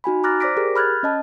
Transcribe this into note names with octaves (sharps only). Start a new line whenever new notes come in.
D#4 F#4 G#5 B5
A#5 D6 F6 F#6 A6 A#6
C5 D5 D6 A#6 B6 D7
G4 G#4 A#4
B5 F6 F#6 G#6 A6
C#4 D#5 A5